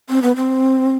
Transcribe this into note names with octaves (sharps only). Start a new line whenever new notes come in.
C4
B3
C4